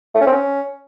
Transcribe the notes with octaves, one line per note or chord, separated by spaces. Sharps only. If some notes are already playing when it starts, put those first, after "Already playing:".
A3
C#4
C4
C#4